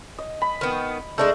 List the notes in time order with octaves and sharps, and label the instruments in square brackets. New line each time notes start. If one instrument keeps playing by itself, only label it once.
[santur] D#5
B5
[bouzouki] D#3 B3
[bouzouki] G#3 D4 D#4 [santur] A3